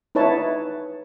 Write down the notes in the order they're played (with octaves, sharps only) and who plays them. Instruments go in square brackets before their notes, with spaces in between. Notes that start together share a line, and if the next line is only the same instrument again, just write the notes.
[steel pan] D#4 E4 B4 C#5 A5